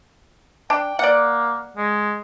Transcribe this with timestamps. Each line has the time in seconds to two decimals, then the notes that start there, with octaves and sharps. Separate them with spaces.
0.70 D4 G5
0.99 A#3 D5 F#5
1.77 G#3